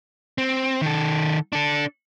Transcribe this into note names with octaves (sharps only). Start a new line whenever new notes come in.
C4
D#3 A4
D4 A4